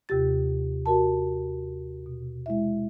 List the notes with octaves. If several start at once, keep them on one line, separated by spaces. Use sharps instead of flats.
D#2 C3 F4 G4 A6
F#4 A#4 A5
B2
G#3 E4 E5